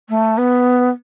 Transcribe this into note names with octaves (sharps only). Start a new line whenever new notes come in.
A3
B3